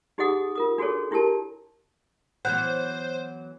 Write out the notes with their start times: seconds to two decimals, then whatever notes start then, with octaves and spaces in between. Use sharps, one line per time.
0.18 D#4 G4 G#4 D#5 F#5 D#6
0.55 F4 A#4 D#6
0.78 D4 F#4 G#4 A4 C#5
1.11 D4 E4 G4 A#4 A5
2.45 E3 F#3 B3 C5 F#5 F#6